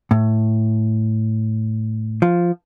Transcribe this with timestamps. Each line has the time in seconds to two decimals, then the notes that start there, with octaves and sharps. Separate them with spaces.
0.11 A2
2.22 F3